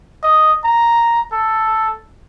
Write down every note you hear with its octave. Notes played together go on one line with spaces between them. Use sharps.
D#5
A#5
A4